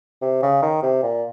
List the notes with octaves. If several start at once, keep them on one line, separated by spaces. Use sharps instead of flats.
C3
C#3
D#3
C3
A#2